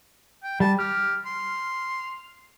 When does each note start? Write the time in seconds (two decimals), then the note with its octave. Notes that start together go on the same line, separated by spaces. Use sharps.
0.43 G5
0.60 G3 A5
0.79 G4 F6
1.26 C6